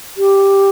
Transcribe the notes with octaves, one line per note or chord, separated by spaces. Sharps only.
G4